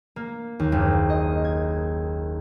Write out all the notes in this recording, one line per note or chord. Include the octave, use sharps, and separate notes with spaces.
A#3
D#2
F#1
D#5
G#6